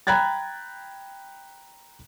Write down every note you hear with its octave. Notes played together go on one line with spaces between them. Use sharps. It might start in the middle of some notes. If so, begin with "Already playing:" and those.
G5 A#5 B5 F#6 G#6 A6